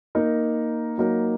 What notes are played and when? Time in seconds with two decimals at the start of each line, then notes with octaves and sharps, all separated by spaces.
0.15 A#3 D#4 A#4
0.98 F#3 A#3 D#4 A#4